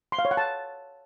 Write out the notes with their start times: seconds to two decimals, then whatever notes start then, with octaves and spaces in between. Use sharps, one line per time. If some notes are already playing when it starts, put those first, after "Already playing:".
0.12 C6
0.19 F5
0.25 C#5
0.31 F#5
0.37 A5